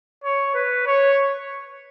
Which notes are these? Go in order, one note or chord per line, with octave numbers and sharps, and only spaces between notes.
C#5
B4
C#5